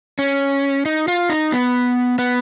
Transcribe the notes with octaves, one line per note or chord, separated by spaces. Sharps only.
C#4
D#4
F4
D#4
B3
B3